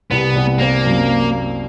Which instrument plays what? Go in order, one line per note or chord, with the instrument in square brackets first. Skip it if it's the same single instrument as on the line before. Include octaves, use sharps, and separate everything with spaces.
[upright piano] C2 [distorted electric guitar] B3
[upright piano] C2
[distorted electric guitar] A#3 [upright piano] C4
[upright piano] F#2